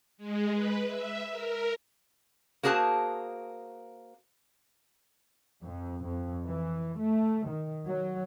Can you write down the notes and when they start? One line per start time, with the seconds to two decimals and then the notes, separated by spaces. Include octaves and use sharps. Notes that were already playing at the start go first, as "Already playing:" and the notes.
0.17 G#3
0.52 B4
0.87 E5
1.31 A#4
2.63 A#3 F#4 G#4 C5 A5
5.63 F2
6.05 F2
6.44 E3
6.98 A3
7.46 D#3
7.85 F#3